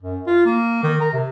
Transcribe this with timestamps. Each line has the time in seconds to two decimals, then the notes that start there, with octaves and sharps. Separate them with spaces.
0.02 F#2
0.27 F4
0.45 A#3
0.83 D#3
1.00 A#4
1.13 C3